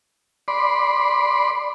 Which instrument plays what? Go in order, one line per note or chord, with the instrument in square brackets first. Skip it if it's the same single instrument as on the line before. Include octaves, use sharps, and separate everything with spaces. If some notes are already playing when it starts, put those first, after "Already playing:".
[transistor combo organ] D5 B5 C6